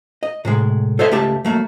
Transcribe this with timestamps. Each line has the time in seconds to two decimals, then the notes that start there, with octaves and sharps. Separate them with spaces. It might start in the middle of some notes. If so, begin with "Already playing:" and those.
0.23 D#5
0.45 A2 C3 G#3
0.99 A4 C5 C#5 D#5 E5
1.11 C#2 A3 G4 A5
1.45 F#3 A3 A#3